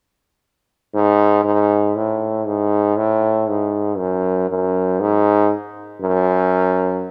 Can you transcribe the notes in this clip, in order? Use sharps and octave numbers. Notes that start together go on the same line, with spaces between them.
G#2
G#2
A2
G#2
A2
G#2
F#2
F#2
G#2
F#2